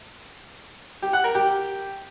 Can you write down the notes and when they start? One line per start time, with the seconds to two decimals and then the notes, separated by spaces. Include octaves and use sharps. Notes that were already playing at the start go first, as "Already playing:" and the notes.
1.02 G4
1.13 F#5
1.24 A#4
1.35 G4